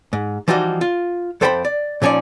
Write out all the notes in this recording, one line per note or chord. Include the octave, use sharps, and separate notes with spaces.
G#2
E3 F3 G3 D#4 F#4 D#5
F4
F2 A4 C5 G5 A#5 B5
D5
A#2 F3 C#4 D#4 D5